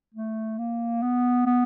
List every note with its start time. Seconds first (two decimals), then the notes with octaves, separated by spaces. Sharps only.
0.14 A3
0.58 A#3
1.02 B3
1.46 B3